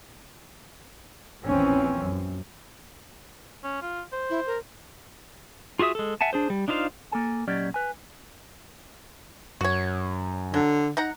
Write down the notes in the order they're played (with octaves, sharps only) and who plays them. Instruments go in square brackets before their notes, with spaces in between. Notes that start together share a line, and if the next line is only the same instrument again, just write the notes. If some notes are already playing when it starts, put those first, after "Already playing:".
[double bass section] A#1 E2 E3 C4 C#4
F#2
[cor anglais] C#4
F4
C5
[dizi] E4
A#4
[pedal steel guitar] F4 F#4 G#4 E5 D#6
G#3 A4
E5 F#5 G#5 A5
D4 G#4 C5
G3
D4 D#4 F4 C5 F5
[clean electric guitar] A#3 A4 G#5
A#2 F#3 C#4 G4 D5 D#5
B4 G#5
[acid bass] F#2 [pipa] F#4 C#5
[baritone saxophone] D3 [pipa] F#3
[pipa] D#4 F#5 A#5